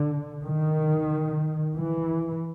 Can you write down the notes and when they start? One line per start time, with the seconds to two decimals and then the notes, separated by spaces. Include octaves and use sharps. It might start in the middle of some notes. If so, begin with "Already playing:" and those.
Already playing: D3
0.45 D#3
1.75 E3